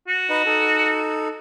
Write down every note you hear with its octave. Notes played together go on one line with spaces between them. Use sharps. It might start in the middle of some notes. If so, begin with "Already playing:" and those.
F#4
D#4 B4 D#5
D#4 A4